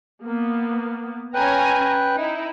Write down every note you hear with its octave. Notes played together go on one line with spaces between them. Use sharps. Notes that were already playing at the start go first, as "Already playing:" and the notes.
A#3 B3
C#4 B4 G5 G#5 A#5 F#6
D#4 E4